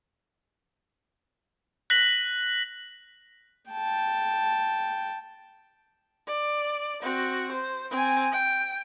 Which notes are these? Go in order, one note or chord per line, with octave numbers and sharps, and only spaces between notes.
F#6 A#6 B6 F#7
G5 A5
D5
C4 F#4
C5
C4 G#5
G5